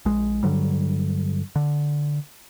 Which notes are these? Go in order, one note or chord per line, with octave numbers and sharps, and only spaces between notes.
A#1 G#3
G2 D3 F#3 G3
D3